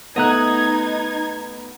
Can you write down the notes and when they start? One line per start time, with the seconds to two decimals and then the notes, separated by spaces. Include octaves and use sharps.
0.16 A3 B3 D#4 D#5 A#5 F#6 G#6